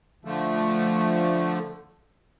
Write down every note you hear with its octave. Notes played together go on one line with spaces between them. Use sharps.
D3 F3 A3